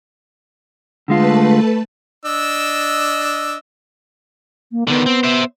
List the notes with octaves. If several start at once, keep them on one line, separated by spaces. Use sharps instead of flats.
D3 G#3 A3 F4 B4 A5
D4 D#5 E6
A#3
D3 D#3 B3
C4
C5 E5